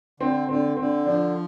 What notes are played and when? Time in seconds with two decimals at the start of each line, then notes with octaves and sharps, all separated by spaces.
0.20 D3 C4
0.49 D3 C4
0.77 D3 C4
1.05 F3 D4